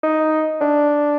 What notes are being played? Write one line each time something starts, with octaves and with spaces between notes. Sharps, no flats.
D#4
D4